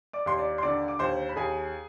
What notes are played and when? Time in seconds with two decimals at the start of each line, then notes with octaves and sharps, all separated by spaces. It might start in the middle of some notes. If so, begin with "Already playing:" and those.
0.13 D5 D6
0.26 D#2 C6
0.38 D5 D6
0.58 C6
0.62 D3 D5 D6
0.88 D6
0.99 D#2 C5 C6
1.29 B5
1.36 D#2 G#4 G#5